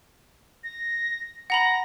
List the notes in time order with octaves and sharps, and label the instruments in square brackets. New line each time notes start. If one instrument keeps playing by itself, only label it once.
[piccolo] A#6
[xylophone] F#5 A#5 B5 [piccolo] A#6